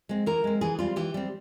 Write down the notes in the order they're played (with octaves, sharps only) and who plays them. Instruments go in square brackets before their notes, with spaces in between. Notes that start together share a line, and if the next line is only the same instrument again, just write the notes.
[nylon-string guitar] G#3 C4
E3 A#4
G#3 C4
E3 G#4
G3 C4 F4
E3 G4
G3 C4